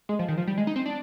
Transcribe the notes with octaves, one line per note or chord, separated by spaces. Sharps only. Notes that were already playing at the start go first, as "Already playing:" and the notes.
G#3
F3
D#3
F3
G3
G#3
D#4
C4
D4